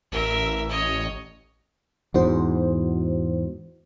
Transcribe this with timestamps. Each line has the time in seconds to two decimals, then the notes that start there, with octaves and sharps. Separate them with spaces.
0.12 A1 A#4 E5
0.69 C#5 D#5
2.14 E2 G#2 F#4 C5